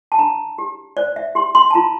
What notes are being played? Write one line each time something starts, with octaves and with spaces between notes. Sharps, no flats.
A5
D4 A#5
G4
C5 D5
E5
G4 C6
C6
A5
F4 A#5